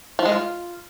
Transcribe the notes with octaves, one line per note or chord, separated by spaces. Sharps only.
F3
G#3
F4